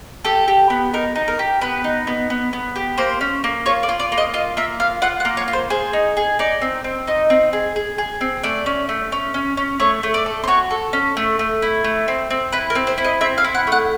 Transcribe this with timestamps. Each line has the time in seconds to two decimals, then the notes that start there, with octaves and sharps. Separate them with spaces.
0.25 G4 A4
0.48 G4
0.70 B3
0.93 D#4 A#4
1.16 D#4
1.28 A#4
1.39 G4
1.61 B3 B4
1.84 D#4
2.07 B3
2.30 B3
2.53 B3
2.76 G4
2.98 A#3 C5
3.21 C#4
3.44 A#3
3.66 F4 C#5
3.83 D5
3.89 F4
4.00 D5
4.12 A#3
4.18 D#5
4.34 F4 D#5
4.57 A#3 E5
4.80 F4 F5
5.02 F4 F#5
5.20 F#5
5.25 A#3
5.37 C#5
5.48 F4
5.53 C5
5.70 G#4 C5
5.93 D#4
6.17 G#4
6.39 D#4 D5
6.62 C4
6.84 C4
7.07 D#4 D#5
7.30 C4
7.53 G#4
7.76 G#4
7.98 G#4
8.21 C4
8.43 A3 D5
8.66 C#4
8.89 A3
9.12 C#4
9.34 C#4
9.57 C#4
9.80 A3 C#5
10.03 A3
10.14 D5
10.26 A4
10.44 C5
10.48 F#4 C#5
10.71 A4
10.93 C#4
11.17 A3
11.39 A3
11.62 E4
11.84 A3
12.08 C4
12.30 C4
12.52 E4 B4
12.70 A#4
12.75 C4
12.87 C5
12.98 E4
13.05 D#5
13.21 C4 E5
13.38 F5
13.44 E4
13.55 F#5
13.67 A3 F#5